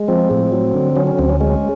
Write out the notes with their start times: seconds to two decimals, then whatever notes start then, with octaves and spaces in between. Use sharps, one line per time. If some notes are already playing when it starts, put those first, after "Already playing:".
Already playing: G#3
0.08 F3 C4
0.31 A2
0.52 F#3
0.74 D3
0.96 F#3 C#4
1.07 C#4
1.19 D2 C4
1.29 C#4
1.41 G#3 C#4